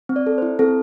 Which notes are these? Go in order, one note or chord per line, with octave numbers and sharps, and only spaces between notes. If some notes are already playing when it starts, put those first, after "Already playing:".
C4
D5
A4
C5
E4
C4 A4